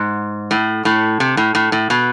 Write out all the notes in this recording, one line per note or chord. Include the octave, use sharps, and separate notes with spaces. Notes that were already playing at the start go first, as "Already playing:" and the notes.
Already playing: G#2
A2
A2
C3
A2
A2
A2
B2